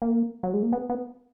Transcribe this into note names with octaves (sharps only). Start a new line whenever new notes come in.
A#3
F#3
G#3
A#3
B3
B3